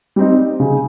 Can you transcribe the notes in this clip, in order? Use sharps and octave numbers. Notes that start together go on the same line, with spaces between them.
G3 C4 D#4
C#3